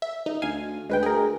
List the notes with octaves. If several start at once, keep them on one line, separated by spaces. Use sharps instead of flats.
E5
D#4
D2 F5 G#5
D2 G#3 B4 G5
G#4 A#4